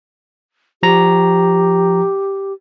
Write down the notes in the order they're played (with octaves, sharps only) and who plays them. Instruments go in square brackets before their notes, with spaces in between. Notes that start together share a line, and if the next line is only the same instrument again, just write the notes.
[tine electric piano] F3 A#5 [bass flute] G4